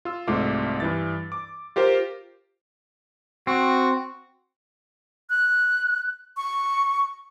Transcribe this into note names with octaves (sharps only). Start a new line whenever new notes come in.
F4 E6
C2 G#2 A3 F4 D6
G2 E3 A6
D6
F4 G4 A#4 C5
C4 F#4
F#6
C#6